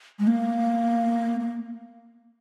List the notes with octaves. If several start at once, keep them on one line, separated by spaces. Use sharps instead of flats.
G#3
A#3
A#3